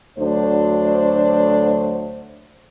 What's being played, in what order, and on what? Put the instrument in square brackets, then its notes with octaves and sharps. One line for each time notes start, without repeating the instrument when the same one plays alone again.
[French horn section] D2 F#3 A3 D4 C5